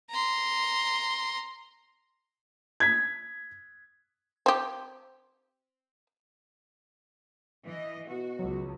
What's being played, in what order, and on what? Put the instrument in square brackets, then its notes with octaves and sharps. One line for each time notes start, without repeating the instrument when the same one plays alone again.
[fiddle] A#5 C6
[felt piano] G#6 B6
[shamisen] C4 G4
[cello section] E3 D#5
[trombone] B2 [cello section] F#4
[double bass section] C#2 [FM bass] F#3